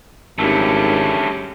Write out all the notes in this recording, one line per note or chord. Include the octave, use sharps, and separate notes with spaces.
G#1 G2 A3 C#4 G4